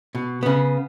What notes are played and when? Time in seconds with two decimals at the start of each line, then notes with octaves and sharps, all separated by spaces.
0.15 B2
0.43 C#3 B3